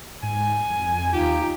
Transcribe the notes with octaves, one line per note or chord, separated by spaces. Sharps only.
G#2 G#5
F2
D#2 D#4 F4 G4